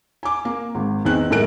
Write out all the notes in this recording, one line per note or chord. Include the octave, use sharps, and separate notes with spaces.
G#5 D6
A#3
G#1
E2 D#3 C4 F#6
F#2 A2 G#3 A#4 F#6 D7